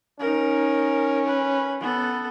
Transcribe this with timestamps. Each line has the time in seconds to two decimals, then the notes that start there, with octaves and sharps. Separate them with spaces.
0.20 C#4 D#4 A#4
1.26 B4
1.80 B3 A4